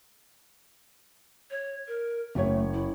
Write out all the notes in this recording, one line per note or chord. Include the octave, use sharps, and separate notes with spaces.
C#5
A#4
F#1 A3 C#5
E4